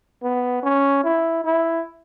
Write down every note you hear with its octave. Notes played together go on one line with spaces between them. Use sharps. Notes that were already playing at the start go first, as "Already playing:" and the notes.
B3
C#4
E4
E4